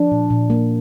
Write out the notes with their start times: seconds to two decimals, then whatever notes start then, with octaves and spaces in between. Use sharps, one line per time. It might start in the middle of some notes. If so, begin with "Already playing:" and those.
Already playing: F3 D4
0.12 A#2
0.30 A#2
0.50 A#3